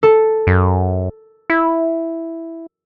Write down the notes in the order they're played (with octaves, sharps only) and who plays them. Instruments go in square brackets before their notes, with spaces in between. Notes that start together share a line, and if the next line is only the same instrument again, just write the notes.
[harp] A4
[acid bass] F#2
E4